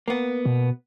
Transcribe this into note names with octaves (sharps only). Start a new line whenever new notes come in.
A#3 B3
B2